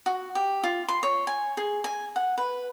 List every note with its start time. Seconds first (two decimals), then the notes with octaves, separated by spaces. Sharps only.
0.06 F#4
0.35 G4
0.64 F4
0.88 C6
1.03 C#5
1.27 G#5
1.57 G#4
1.84 G#5
2.16 F#5
2.38 B4